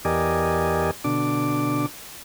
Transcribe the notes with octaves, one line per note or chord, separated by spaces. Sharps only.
E2 G4 A#4 D5 D#5 G#5
B2 D3 D4 D6